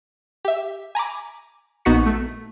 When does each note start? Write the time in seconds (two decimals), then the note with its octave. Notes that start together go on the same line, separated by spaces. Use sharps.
0.45 G4 E5
0.95 G#5 A#5 B5 D6
1.85 A#1 B3 D#4 F#4 B6 C#7
2.06 A3